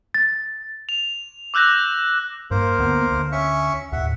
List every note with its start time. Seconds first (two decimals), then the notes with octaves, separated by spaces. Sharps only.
0.14 A6
0.89 F7
1.54 D6 E6 F#6 G6 A#6
2.51 G2 A#3 A#4 C5
2.78 D2 B3
3.11 D2
3.32 C#4 E5 C#6
3.92 D#2 A2 E5 F#5